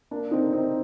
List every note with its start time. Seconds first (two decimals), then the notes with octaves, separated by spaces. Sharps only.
0.11 A#3 D4
0.31 C4 D#4
0.53 C4 D#4